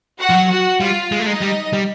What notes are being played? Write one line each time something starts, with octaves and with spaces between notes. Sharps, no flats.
F#4 F#5
F3
F#3
F#4 F#5
G3 F4 F5
G#3
A3
G#3 D#4 D#5
G3
G3